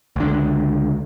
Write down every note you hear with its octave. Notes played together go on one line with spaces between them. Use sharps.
C#2 D3